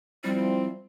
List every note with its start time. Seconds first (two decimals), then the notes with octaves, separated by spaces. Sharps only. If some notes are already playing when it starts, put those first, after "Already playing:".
0.24 F3 G3 C4 E4